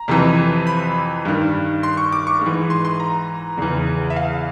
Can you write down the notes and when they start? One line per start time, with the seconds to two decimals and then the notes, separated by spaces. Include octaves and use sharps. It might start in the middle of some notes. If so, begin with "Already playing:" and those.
Already playing: A#5
0.08 F2 C3 E3
0.67 B5
1.25 G2 D#3
1.83 C6
1.97 C#6
2.12 D6
2.27 C#6
2.41 G#2 E3
2.70 C6
2.85 C6
3.00 A#5
3.58 E2 C#3 E3
4.10 E5
4.16 F5